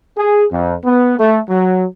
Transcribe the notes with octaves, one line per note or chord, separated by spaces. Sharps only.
G#4
F2
B3
A3
F#3